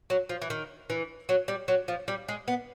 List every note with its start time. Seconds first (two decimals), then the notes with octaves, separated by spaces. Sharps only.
0.10 F#3
0.29 F3
0.42 E3
0.50 D#3
0.90 E3
1.29 F#3
1.48 G3
1.68 F#3
1.88 F3
2.08 G3
2.29 G#3
2.48 B3